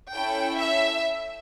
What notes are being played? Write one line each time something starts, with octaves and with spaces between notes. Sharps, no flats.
C#4 E4 A4 G5
E5